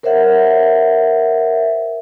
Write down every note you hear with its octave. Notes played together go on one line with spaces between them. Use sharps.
A#4 C5 C#5 E5 F#5